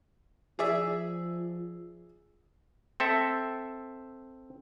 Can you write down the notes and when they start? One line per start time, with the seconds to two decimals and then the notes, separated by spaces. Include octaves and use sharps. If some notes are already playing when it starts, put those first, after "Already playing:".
0.59 F3 G#4 D5 E5
3.00 C4 A4 E5